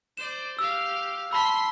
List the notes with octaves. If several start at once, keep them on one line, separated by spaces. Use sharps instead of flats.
C5 D5 E7
G4 F5 E6
A5 B5 C6 E6 B6